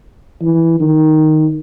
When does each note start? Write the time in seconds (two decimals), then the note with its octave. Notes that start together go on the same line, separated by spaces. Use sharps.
0.42 E3
0.80 D#3